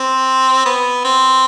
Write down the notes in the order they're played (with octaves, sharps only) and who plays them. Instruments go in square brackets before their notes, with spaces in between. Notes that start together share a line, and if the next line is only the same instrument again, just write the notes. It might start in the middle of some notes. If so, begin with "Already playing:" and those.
Already playing: [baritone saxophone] C4
B3
C4